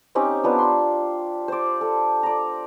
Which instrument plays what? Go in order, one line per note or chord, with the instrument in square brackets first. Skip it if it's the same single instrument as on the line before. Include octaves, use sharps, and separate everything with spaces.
[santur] C4 C#4 D#4 G4
B3 D4 F4
C6
C5 D5
A4
D5 A#5